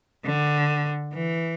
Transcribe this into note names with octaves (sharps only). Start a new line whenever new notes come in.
D3
E3